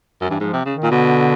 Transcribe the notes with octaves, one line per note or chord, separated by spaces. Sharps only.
F#2
G2 E3
G#2 F3
C3
C#3
D#3
A#2
B2 D3